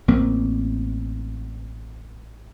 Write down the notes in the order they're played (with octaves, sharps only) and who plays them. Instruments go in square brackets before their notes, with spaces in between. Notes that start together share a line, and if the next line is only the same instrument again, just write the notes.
[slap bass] A1 A#3 C4